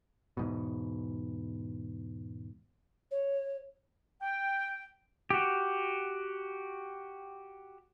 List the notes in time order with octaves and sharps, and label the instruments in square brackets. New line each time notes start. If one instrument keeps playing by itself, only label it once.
[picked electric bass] E2 G#2 B2
[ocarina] C#5
[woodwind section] G5
[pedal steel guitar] F#4 G4